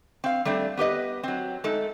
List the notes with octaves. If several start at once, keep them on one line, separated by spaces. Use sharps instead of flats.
C4 F5
G3 A3 C4 D4
B3 G4 B4 D#5
F#3 C4
G#3 A3 D#4 A4